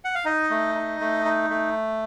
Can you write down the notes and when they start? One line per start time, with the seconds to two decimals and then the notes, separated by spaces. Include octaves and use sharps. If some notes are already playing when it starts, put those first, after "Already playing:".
0.05 F#5
0.15 F5
0.25 D#4 D#5
0.50 A3
0.75 D#4
1.01 A3
1.25 D#4
1.50 A3